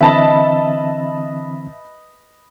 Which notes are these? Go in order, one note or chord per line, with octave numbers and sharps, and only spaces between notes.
D3 E3 C4 B4 D#5 E5 A5 B5